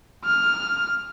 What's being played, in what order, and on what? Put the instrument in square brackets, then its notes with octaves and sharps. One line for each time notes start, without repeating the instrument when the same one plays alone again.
[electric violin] F6